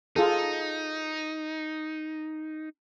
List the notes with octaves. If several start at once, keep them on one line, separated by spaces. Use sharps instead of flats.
D#4 F4 G#4 A4